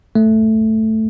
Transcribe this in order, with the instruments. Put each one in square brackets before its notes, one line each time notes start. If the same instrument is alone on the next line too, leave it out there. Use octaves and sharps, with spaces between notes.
[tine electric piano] A3